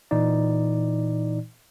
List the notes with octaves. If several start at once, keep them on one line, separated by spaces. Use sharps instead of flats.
A#2 E3 D#4 D5